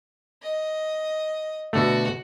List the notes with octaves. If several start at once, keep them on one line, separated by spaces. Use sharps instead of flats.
D#5
B2 D3 A3 F#4